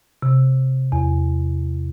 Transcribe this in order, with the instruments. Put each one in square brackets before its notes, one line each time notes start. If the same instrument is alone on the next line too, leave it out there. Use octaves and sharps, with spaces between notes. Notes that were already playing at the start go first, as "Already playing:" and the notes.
[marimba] C3
E2